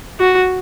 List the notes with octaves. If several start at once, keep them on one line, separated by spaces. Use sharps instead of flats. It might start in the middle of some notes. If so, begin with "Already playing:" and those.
F#4